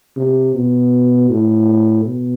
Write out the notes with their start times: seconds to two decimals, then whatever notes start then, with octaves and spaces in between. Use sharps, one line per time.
0.17 C3
0.55 B2
1.30 A2
2.05 B2